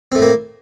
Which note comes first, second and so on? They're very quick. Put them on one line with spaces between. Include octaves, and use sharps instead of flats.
C4 A3 A2 A#3